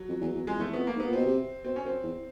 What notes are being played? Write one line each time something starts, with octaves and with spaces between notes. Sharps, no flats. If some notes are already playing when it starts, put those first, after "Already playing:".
Already playing: F#3
F2
E2
E2
F2 G#3
E2
A3
E2
F2 B3
A#3
G#2
B3
A#2
B2 C4
C3
B2 C4
C#4
F#2 C4
E2